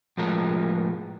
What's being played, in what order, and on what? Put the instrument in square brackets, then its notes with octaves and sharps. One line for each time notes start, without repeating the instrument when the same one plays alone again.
[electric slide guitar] A2 F3 G#3 A#4